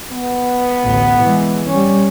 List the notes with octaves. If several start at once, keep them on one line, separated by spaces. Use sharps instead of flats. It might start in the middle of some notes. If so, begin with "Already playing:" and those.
B3
A1 D2
E3 G#3
G3 C#4